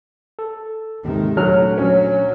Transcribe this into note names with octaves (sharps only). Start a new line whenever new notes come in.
A4
D#2 G#2 C3 D#3 G#3
A#2 D3 F#3 A3 F6
F#3 C#4